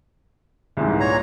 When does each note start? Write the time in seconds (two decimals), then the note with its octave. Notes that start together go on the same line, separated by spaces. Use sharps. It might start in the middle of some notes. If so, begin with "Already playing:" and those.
0.77 C2 G#2 E3
1.00 A#2 C#5 A#5